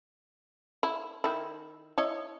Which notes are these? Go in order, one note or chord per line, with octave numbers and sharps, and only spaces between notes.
E4
D#3 E4
E4 C#5 D#5